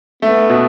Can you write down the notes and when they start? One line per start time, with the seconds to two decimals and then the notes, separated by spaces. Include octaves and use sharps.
0.22 A3 B3
0.49 B2